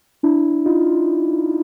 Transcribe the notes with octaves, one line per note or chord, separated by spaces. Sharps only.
D4 E4
D#4 F4